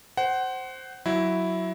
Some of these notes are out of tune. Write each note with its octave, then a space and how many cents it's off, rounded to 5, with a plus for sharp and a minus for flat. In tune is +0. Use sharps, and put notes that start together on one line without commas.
C5 +0 F#5 +25
F#3 +0 E4 +0